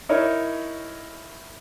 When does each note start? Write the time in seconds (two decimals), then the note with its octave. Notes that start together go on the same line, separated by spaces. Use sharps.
0.09 D#4 E4 A#4 C#5